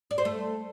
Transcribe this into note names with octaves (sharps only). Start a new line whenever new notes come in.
D5
C5
A3